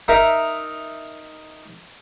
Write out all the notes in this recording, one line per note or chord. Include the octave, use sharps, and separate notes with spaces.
D#4 A#4 E5